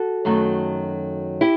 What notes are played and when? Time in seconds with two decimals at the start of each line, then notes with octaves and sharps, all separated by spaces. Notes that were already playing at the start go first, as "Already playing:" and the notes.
Already playing: F#4 A4
0.25 F#2 D#3 F#3 A3
1.41 E4 G4